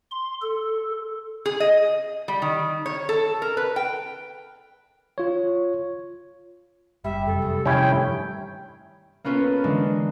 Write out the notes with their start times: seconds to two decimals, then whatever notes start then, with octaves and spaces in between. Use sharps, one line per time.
0.11 C6
0.41 A4
1.46 G#4
1.60 D#5
2.28 G3
2.42 D#3
2.86 C#5
3.09 A4
3.42 A#4
3.57 B4
3.76 G5
5.18 F4 C#5
7.04 F#1 G3 E5
7.27 F1 F#2 C3 A4
7.42 E2
7.66 C3 D#3 F3 C#4 E4 G4 G5
7.91 G2 A3 D4
9.24 A#3 B3 C#4 F4 A4 B4
9.64 D3 E3 G#3 D4